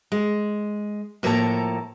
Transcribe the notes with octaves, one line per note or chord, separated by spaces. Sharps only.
G#3
A2 F3 A#3 A4 A5 A#5